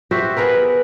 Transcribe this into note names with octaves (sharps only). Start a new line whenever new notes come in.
F#4 G4 C5 E5
B3 G#4 A#4 B4